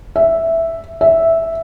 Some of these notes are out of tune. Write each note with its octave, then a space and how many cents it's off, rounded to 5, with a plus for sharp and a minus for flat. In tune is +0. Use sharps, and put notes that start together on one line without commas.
E5 +0
E5 -5